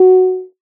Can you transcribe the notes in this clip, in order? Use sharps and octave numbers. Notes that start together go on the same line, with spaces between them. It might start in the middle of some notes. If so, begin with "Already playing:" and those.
Already playing: F#4